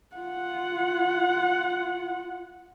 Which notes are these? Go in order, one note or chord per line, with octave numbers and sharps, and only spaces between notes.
F4 F#5